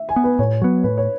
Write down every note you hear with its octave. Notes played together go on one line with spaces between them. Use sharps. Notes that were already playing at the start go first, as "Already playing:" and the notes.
Already playing: E5
G#5
B3
B4
A2 C#5
F#3 B3
A2 B4
C#5